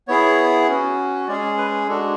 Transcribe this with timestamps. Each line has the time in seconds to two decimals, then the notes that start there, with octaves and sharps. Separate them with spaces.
0.08 B3 E4 G#4 C#5
0.68 C#4 F#4
1.28 G#3 C#4 G#4 D5
1.58 B4
1.88 G#3 D4 F#4 A4